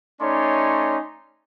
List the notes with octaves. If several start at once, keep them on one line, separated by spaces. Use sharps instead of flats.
A3 C#4 D#4 C#5 D5 C6